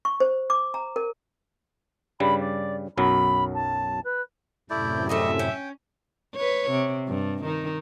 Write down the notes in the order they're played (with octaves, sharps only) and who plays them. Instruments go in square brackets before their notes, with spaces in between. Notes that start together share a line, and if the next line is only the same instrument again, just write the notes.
[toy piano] C#6
C5
D6
A#5
A#4
[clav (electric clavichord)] G2 C#3 G3 [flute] B5
[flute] D5
[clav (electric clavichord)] B1 F#2 F#3 [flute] B5
[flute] A5
B4
[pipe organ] F#2 A2 C3 [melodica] A3 E4 D5 [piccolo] G6
[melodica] G3 D#5 [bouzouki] A3 C4 G#4 [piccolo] E5
[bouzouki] C#4 [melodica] G5
[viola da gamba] B4 C#5
C3
G2
D#3 D#4